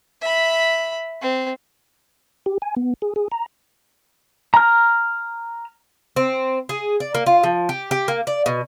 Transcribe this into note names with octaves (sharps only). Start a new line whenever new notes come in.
E5 B5
C4
G4
G#5
B3
G#4
G#4
A#5
A#5 F6
C4
G#4
D5
A#3
F4
F3
G4
G4
A#3
D5
B2